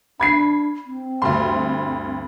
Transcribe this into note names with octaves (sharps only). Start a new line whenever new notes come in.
D4 B5 G#6 C7
C4
D2 G2 C6